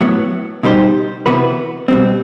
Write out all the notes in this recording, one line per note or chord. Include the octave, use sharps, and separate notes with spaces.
A2 F#3 B3
B2 G3 D#4 G4 C5
C3 E3 B3 F#4 B4
B2 G3 C4